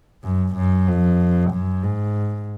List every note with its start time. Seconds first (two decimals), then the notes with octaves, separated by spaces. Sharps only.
0.24 F#2
0.56 F#2
0.87 F2
1.51 F#2
1.83 G#2